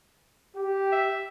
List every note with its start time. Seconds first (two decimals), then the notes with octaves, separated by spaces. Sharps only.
0.56 G4
0.92 E5